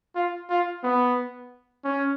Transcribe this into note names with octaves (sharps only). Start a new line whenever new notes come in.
F4
F4
B3
C#4